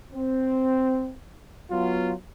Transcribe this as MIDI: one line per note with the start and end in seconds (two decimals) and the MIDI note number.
0.13 1.12 60
1.71 2.13 54
1.71 2.13 59
1.71 2.13 65